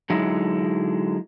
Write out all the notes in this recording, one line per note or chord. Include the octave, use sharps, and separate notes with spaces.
D3 F#3 G#3 D#4 E4